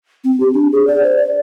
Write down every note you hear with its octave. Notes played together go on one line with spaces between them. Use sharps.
C4
G4
D4
G#4
D5
C5
D5